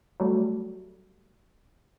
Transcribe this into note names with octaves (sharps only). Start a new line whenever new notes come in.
F#3 G3 A3